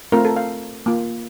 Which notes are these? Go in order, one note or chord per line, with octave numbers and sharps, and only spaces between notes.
A3 C4 F4 A#4
A4
F5
A#3 F4